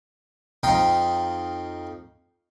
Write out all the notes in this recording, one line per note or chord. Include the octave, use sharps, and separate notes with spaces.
F2 D#4 F5 G5